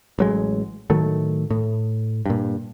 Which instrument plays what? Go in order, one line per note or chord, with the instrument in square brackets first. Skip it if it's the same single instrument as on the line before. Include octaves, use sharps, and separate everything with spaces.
[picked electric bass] A1 F#3 G#3
A2 D#3 F#3 A3
A2
G2 A#2